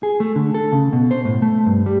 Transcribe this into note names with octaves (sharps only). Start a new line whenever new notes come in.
G#4
A3
D3
A4
C#3
B2
C5
A2
A3
G2
G3